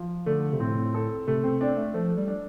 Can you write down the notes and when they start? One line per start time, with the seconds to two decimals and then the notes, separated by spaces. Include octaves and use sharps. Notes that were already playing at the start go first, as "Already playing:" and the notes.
Already playing: F3
0.26 D3 A3
0.53 C3
0.60 A2 C4
0.94 A4
1.27 C3 A3
1.44 C4
1.61 C4 D4
1.77 A3
1.94 F3 A3
2.17 G3
2.28 D4